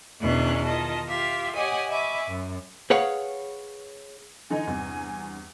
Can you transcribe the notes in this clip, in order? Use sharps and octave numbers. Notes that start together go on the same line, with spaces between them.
E2 B2 D#3 C#4 D4 F#6
D#3 F4 D#5 A5
F4 G4 E5 F5
G4 C#5 D#5 F#5 G#5 D#6
D#5 E5 G#5 B5 C#6 D6
F#2
G#4 B4 C#5 F5 F#5
D3 E3 D#4 G#5
E2 G2 C3